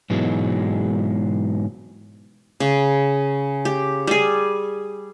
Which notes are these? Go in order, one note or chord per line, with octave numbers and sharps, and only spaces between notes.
G#2 B2 E3 F#3 G#3
C#3
G4
G3 G#4